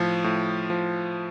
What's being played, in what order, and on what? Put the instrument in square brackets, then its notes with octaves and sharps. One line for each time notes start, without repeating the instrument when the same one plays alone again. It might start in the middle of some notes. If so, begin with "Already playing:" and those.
Already playing: [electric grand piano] A2 F3
A2
F3